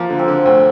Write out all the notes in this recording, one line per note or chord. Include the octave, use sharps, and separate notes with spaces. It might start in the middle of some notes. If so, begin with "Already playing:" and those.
Already playing: F3 A#3 F4
D3
C4
D3
D2 C4